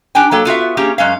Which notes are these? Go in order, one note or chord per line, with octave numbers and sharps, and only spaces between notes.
D4 G4 G5 G#5
F#3 A#3 A4 G5
B3 F4 F#4 E5
A#3 C#4 G4 G#4
F#2 G#3 C#4 F5